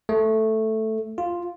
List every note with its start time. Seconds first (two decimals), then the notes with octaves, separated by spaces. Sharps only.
0.09 A3
1.18 F4